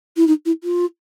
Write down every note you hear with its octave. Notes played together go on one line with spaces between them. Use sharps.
E4
D#4
E4
F4